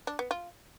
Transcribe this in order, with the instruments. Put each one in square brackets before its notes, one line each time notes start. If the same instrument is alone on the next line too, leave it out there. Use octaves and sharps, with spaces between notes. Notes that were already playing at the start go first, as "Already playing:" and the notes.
[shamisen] D4
B3
F4